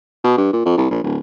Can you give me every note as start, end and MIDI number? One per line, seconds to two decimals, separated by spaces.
0.24 0.33 47
0.37 0.51 43
0.53 0.65 46
0.65 0.74 41
0.77 0.89 36
0.91 1.01 34
1.03 1.18 26